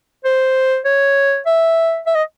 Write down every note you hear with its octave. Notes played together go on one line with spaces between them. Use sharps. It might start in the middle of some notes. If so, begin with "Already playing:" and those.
C5
C#5
E5
E5
D#5